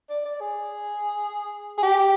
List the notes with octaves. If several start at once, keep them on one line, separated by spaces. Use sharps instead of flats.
D5
D5
G#4
G#4
G4